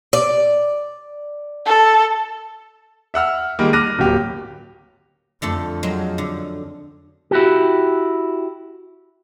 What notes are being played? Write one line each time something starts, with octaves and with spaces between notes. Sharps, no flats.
D5
A4
E5 F#5 E6 F6
D#3 G3 G#3 A#3
D6 F6 F#6 A#6 D#7
D1 F#3 A#3 G4
F2 D3 A3 A4
F#3 G#3
D3
E4 F#4 G4